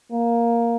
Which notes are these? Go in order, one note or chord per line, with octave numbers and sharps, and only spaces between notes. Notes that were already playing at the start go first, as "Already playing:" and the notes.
A#3